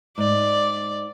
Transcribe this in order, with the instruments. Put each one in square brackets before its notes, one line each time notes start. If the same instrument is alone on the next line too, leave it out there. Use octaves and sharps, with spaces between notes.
[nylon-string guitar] G#2 [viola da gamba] D5